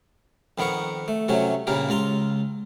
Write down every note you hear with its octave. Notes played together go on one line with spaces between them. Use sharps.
F2 D#3 B3 A#4 C#6
A3
C3 F#3 A3 C#4
G2 A#2 C#3 G3 A#4
C#2 F4 A#5 C6